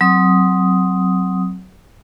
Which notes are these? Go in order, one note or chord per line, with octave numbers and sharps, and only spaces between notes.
F#3 C4 D#6